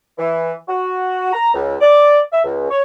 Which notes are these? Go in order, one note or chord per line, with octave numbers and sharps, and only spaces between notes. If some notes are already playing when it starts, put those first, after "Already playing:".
E3
F#4
A#5
C#2
D5
E5
C#2
C#5